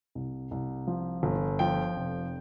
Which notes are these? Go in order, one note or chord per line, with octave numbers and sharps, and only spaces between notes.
C2
C2
F3
G1
F3 G5
F1